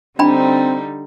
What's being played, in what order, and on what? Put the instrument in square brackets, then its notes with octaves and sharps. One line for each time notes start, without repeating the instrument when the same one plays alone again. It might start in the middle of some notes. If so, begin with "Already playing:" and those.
[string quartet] D3 G3 D#4 [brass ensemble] C4 [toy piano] D4 G5 B5